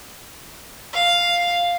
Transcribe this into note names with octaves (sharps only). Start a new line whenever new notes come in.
F5